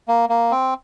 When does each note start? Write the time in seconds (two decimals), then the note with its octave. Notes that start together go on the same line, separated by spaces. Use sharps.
0.08 A#3
0.29 A#3
0.51 C4